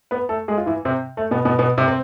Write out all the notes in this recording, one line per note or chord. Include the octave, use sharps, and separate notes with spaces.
B3 B4
A3 A4
G#3 G#4
F4
E3 E4
C3 C4
A3
B2 B3
B2 B3
B2 B3
C3 C4
C4